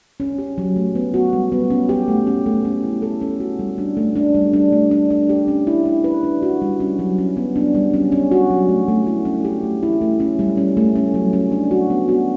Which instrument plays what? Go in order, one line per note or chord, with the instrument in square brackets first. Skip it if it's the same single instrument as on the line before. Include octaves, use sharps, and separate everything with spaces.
[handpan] C#4
G4
F#3
A3
B3
F#4
G3
B3
C#4
G4
A3
C#4
A3
C#4
E4
A4
C#4
F#4
G3
D4
A3
D4
G3
D4
A3
D4
D4
G4
C#4
E4
E4
B4
D4
F#4
G3
C#4
F#3
C#4
B3
D4
G3
C#4
C#4
F#4
F#3
A3
A3
E4
C#4
G4
A3
E4
A3
C#4
G3
C#4
A3
C#4
F#3
C#4
D4
F#4
B3
F#4